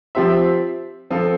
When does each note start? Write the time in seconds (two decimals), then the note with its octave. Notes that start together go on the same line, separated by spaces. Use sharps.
0.15 F3 C4 G4 C5 E5
1.10 F3 C4 F4 A4